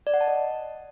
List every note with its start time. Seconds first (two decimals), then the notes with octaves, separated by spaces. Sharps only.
0.07 D5
0.14 F#5
0.21 A5
0.28 D#5